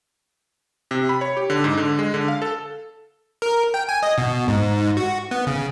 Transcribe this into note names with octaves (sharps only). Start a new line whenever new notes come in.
C3
B5
C#5
G4
D3
G#2
D3
G#3
D3
F5
A4
A#4
G5
G#5
D#5
B2
G#2
F#4
B3
C#3